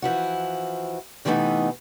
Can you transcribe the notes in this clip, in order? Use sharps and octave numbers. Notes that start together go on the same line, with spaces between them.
E3 F3 E4 F#4
C3 E3 G3 A3 B3 D#4